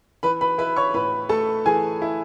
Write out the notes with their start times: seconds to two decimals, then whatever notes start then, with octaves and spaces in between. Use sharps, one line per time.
0.23 E3 B4 B5
0.41 B4 B5
0.58 E4 B4 B5
0.76 C#5 C#6
0.94 A2 B4 B5
1.29 A3 A4 A5
1.66 E3 G#4 G#5
2.02 E4